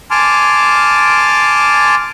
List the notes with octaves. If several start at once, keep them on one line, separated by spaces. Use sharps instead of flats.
G#5 A5 C6 D6 F6